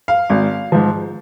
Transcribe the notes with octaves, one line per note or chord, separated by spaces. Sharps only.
F5
G#1
G#2 F3